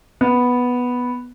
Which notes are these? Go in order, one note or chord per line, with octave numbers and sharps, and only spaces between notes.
B3